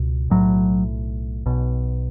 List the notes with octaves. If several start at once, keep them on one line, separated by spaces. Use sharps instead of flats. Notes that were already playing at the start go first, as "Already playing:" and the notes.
Already playing: C#2 B2
B1 A2 F#3
B1 B2